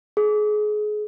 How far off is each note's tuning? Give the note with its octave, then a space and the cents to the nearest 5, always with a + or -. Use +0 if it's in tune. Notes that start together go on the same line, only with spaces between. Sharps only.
G#4 +30